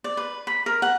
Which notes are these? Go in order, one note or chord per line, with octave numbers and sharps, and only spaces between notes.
D5
B4
B5
A#4
F#5